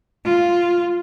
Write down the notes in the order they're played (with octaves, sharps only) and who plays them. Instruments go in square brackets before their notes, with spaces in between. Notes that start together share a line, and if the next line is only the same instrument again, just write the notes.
[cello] F4